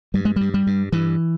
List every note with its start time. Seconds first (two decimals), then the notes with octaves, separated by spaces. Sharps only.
0.14 G2 G3
0.25 G#3
0.36 G2 G3
0.54 G3
0.67 G2
0.92 G2 E3